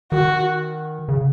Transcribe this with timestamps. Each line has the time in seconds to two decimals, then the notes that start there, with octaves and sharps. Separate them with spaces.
0.12 D#3 F#4
1.09 C#3